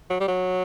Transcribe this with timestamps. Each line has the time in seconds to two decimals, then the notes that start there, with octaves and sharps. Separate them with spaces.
0.10 F#3
0.20 G3
0.28 F#3